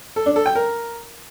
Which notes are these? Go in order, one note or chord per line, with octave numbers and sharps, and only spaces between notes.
A4
D4
A4
G5
A#4